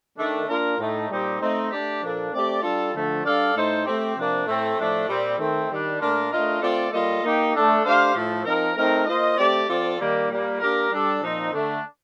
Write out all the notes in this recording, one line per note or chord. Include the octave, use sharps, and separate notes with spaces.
D#3 A3 D4
A#3 D4 F4 A#4
A2 A3 D#4
A#2 G3 C4 D#4 G4
A3 C4 D#4
A3 D4 G4 D5
A#2 F3 A#3 D4 A4
A3 C4 G4 D5
G3 D4 F4 A4
D3 F3 A3
G3 D4 A4 D5 F5
A2 A3 D#4 A4 C5
A3 C4 G4
C3 F3 A#3 D4
A2 A3 C4
A2 F3 A3 D4
A#2 G3 C4
D#3 A3 C4
D#3 G3 D4
A#2 A3 D4 F4 A#4
A3 D4 F4 A#4 D#5
A3 C4 F4 A4 D5
G3 A#3 F4 A4 D#5
A#3 D#4 G4
A3 D4 A4
A3 D4 G4 C5 F5
A2 F3 A3
F3 C4 D#4 A#4
A3 C4 D#4 A#4
A#3 F4 C5 D#5
A3 C4 G4 D5
F3 C4 F4 A4 D5
D#3 G3 A#3
A#2 G3 A#3
A#3 D4 G4 A#4
G3 D4 A4
A#2 F3 C4 D#4
D3 A3 D4